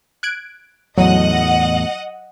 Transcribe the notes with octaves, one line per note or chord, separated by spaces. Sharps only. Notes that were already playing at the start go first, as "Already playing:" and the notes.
F#6 G#6 D7
E2 A2 F#3 D#5 F#5